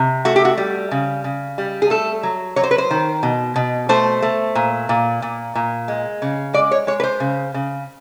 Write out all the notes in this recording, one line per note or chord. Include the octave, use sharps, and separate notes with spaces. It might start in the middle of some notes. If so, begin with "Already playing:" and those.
Already playing: C3
A3 F#4
G4
F#4
G3
C#3
C#3
G3
G#4
A3 A4
F#3
F#3 C#5
C5
B4
C5
D#3
B2
B2
A3 C5
A3
A#2
A#2
A#2
A#2
G#3
C#3
G#3 D5
C#5
G#3 C#5
B4
C5
C#3
C#3